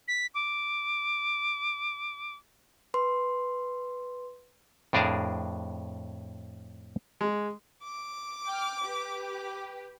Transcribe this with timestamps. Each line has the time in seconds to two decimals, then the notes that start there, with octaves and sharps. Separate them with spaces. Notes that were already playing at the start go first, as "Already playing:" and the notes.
0.08 B6
0.34 D6
2.94 B4 C6
4.93 F2 A2 D4 G#4 A#4 A5
7.21 G#3
7.83 D6
8.48 G5 F6
8.84 G4 B4